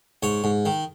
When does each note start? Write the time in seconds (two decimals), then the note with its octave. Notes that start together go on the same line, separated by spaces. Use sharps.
0.23 G#2 C#5
0.44 G#2
0.65 D#3